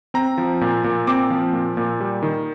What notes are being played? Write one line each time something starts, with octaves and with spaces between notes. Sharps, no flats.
C4 A#5
F3
A#2
A#2
C4 D6
F3
A#2
A#2
G3
D#3